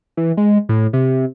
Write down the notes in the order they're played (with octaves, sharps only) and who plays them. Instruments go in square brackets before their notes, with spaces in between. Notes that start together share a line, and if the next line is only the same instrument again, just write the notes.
[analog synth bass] E3
G#3
A2
C3